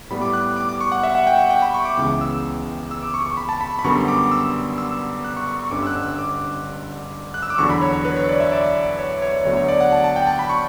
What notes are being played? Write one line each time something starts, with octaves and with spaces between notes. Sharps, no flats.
A2 G3 B3 B5
D6
F#6
D6
D6
C#6
F#5
E5
F#5
G5
F#5
G5
B5
C#6
D6
C#2 C#3 E3 B3 D6
E6
E6
D6
C#6
C#6
B5
A5
B5
B5
F#2 D3 G3 B3 C#6
D6
E6
E6
F#6
C#6
C#6
C#6
G1 G2 D3 G3 C#4 D6
E6
F#6
E6
D6
F#6
E6
D6
E2 D3 F#3 C#6
B5
C#5
C#5
B4
C#5
D5
E5
D5
C#5
C#5
D2 D3 F#3 B3 C#5
C#5
D5
F#5
A5
A5
G5
A5
B5
C#6